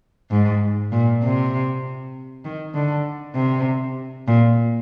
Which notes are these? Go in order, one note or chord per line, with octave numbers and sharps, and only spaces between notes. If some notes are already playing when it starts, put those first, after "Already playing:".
G#2
A#2
C3
D#3
D3
C3
A#2